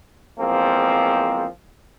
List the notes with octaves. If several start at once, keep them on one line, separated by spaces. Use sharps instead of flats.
E2 F3 G#3 A#3 C4